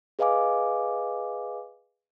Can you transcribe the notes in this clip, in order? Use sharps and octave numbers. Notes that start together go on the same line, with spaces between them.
G#4 B4 D#5 F5 G#5 D6